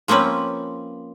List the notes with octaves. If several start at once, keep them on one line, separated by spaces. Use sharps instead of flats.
F3 A#3 C4 C#4 B4